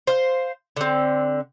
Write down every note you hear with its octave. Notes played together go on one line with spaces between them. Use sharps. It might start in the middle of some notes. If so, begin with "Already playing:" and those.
C5 F5
D3 C4